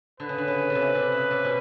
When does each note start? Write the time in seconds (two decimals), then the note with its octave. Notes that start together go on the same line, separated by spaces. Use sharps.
0.20 D3 B4
0.29 C#3
0.38 D3
0.48 C#3
0.70 C#3
0.75 C3
0.95 C3
1.12 C#3
1.31 C3
1.45 B2